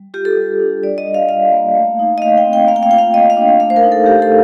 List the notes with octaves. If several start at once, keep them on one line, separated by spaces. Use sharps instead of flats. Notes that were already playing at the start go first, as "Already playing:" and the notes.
Already playing: G3
F4 G4
A4
G3
D4
G3 D5
D#5
D4
F5
F4 F5
A#3
A3
D#4
D#5
A3 F5
G5
C4
G5
A#3 F5
G5
F5
F4 G5
F5
A#3 D#5
F5
D4
A3 F5
C5
A#4
D#4
A4
A3 G4
A4